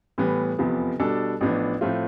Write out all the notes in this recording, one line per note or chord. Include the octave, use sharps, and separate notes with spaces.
A2 E3 G3 B3
F1 E2 C3 F3 B3
B2 G3 D4 A4
A1 A2 F3 B3 D4
A2 F3 A3 C4 F4